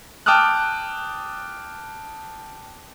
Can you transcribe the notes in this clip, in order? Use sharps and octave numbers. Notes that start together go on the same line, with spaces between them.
G5 A5 D6 D#6 F6 F#6